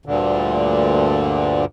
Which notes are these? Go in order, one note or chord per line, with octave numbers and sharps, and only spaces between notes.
D2 G2 A#2 D3